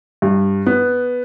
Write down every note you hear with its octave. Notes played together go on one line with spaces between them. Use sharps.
G2
B3